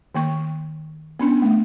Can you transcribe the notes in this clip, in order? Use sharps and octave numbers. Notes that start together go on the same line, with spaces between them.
D#3 A#3 C#6
B3 C#4 D4
A3